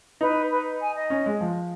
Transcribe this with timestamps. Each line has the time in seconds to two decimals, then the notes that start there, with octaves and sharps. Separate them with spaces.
0.21 D#4 B4
0.50 B4
0.81 G#5
0.95 D#5
1.10 C#4
1.26 G#3
1.41 F3